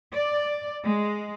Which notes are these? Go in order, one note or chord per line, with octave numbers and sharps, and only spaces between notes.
D5
G#3